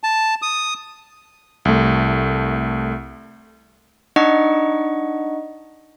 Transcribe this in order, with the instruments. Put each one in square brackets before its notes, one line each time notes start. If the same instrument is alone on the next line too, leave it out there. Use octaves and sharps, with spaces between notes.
[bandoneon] A5
D#6
[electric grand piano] C2 A3
[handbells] D4 D#4 D#5 F#5 C#6